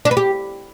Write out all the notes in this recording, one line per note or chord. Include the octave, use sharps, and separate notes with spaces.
D4
B4
G4